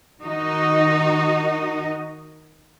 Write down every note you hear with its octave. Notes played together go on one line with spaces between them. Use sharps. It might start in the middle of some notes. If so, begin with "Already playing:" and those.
D#3 D#4 F#4 D#5